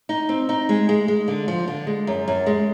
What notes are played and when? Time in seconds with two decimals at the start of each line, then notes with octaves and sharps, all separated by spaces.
0.09 D#4
0.29 C4
0.49 D#4
0.69 G#3
0.89 G#3
1.08 G#3
1.28 D3
1.48 F3
1.68 D3
1.87 G#3
2.07 F#2
2.28 F#2
2.46 G#3